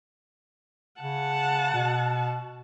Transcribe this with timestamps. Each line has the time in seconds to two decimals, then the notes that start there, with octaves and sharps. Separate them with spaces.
1.01 C#3 F#5 A5
1.74 B2